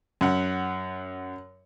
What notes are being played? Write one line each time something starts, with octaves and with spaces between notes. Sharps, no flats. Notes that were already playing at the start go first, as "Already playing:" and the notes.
F#2 F#5